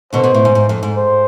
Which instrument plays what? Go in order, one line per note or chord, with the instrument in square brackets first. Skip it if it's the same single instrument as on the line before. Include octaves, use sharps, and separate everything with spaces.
[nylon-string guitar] B2 D3 [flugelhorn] C5
[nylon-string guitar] B2
A2
G#2
G#2
F2
G#2
[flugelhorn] C5